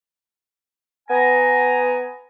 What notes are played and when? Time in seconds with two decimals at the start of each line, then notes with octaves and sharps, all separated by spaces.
1.09 B3 G#5 A#5